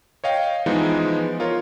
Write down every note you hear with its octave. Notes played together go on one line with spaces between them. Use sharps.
C#5 D#5 F5 G5
E3 F3 G#3 B3 D#4
F4 A#4 C#5